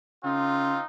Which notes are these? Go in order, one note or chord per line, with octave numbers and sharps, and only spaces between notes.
C#3 C4 D#4 F4